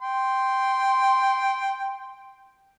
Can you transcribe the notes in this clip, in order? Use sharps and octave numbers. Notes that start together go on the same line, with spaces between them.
G5 C6